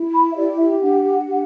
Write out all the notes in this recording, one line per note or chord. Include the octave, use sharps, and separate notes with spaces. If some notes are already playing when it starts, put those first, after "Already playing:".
Already playing: E4
B5
E5
G4 D5
E5
D4 F#5
G4